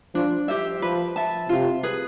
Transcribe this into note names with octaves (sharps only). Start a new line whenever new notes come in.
F3 D4
G4 C5 E5
F3 B4
E5 A5
C3 F4
G#4 B4